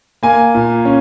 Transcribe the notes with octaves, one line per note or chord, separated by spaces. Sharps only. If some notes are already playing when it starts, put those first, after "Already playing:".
A#3 G#5
A#2
C#4